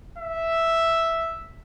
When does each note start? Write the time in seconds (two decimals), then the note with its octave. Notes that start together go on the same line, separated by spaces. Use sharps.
0.18 E5